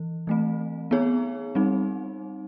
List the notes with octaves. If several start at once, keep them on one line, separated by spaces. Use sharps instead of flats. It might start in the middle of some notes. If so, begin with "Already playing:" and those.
Already playing: E3
E3 A3 C4
B3 D#4 G#4 C#5
G3 C4 D#4